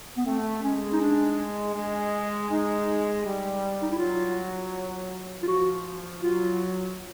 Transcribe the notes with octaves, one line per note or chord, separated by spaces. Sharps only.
B3
A3 C4
G#3 C#4
D#4
D4
G#3
G#3 D#4
G3
D#4
E4
F#3 F4
F4
F3 F#4
F#3 F4